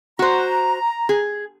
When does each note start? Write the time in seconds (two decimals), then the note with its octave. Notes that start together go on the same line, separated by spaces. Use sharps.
0.19 F#4 C5 A#5
1.09 G#4